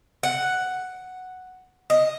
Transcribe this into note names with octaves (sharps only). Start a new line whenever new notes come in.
F#5
D#5